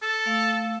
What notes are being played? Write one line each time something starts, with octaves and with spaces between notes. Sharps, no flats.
A4 E6
A3 F5